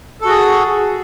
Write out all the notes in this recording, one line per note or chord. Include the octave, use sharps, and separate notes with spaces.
F#4 G#4 A4